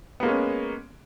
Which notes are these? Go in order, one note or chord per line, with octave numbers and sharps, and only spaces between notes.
G#3 A#3 B3 C#4